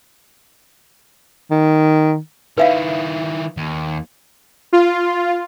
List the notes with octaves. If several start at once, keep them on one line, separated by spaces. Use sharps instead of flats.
D#3
D#3 E4 B4 E5 F5
D#2
F4